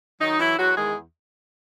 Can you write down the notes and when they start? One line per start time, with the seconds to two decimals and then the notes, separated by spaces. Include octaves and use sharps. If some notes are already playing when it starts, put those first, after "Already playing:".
0.20 D#3 F#3 D#4
0.38 E3 F#3 E4
0.58 E2 F#3 F#4
0.76 D#3 G#3 G#4